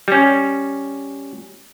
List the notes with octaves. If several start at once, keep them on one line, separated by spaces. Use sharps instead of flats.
G3 C#4